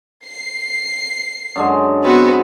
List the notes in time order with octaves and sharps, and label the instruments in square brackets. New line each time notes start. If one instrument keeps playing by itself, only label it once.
[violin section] C7
[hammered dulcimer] F#2 D3 G#3
[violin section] B3 F#4 [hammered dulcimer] C4